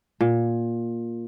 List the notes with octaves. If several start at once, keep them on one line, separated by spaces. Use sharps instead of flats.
A#2